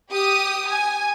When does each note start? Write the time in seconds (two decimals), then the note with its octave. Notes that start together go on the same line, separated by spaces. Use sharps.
0.11 G4 D#6
0.68 G#5